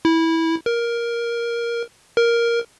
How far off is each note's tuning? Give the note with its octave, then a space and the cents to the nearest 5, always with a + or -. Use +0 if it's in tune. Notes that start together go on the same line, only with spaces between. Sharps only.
E4 -15
A#4 +10
A#4 +5